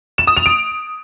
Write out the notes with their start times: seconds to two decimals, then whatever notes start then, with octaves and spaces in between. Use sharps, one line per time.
0.18 E7
0.27 D#6
0.37 F7
0.46 D7